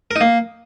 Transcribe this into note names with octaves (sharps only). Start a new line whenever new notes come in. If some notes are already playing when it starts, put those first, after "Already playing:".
A#4
D#4
A#3